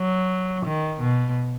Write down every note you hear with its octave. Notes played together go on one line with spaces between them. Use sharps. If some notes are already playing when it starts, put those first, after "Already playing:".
Already playing: F#3
D#3
B2